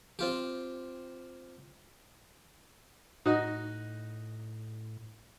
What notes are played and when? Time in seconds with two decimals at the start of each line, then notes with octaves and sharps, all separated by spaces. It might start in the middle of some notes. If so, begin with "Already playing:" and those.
0.19 C4 F4 G4
3.26 A2 D#4 F#4 D#5